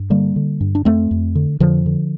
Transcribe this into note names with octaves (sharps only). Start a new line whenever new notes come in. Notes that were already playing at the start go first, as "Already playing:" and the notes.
Already playing: G2
D3 G3 A#3
D3
G2
D4
F2 A3 C4
F2
D3
F2 D3 F3
D3